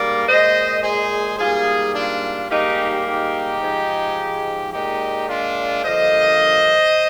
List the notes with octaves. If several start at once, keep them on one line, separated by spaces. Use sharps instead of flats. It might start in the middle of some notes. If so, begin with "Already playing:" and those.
Already playing: G#2 G3 A#3 A#4 D5
A#2 G#3 C5 D#5
G#4 C5
G#2 G3 A#3 F4 G#4
D4 F4
G#2 G3 A#3 D#4 G4
D#4 G4
G#2 F3 G#3
A#2 G#3 D#4 G4
D4 F4
G2 D3 F3 A#3 C5 D#5